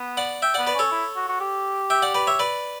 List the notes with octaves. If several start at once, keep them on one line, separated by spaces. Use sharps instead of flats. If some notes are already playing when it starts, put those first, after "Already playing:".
Already playing: B3
D5 F#5
E5 G5
B3 D5 F#5
B4 D5
C#4 A4 C#5
E4
F#4
F#4
G4
E5 G5
D5 F#5
B4 D5
C#5 E5
B4 D5